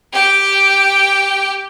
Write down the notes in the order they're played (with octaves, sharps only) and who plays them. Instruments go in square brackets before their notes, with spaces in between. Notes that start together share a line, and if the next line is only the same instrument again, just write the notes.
[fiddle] G4 G5